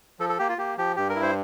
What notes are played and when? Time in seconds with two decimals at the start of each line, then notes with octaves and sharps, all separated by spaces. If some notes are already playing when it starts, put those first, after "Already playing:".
0.19 F3 A4
0.29 A4
0.39 A#3 G4
0.49 F4
0.58 A#3 G4
0.77 F3 G4
0.96 G2 G4
1.09 A#4
1.16 E4
1.23 C5